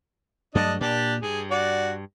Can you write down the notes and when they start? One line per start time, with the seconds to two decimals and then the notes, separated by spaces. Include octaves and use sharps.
0.55 G2 F#3 A3 D4 D#5
0.81 A#2 D4 G4
1.22 G2 G#4
1.51 F#4 D5